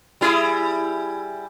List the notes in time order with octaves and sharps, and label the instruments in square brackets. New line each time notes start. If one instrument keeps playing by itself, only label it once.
[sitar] G3 E4 G#4